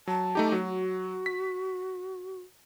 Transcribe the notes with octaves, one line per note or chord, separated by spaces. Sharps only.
F#3 A5
A3 D#4 G4
F#3 F#4
B6